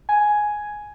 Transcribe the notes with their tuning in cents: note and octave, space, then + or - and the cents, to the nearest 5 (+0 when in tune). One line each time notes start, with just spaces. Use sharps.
G#5 +5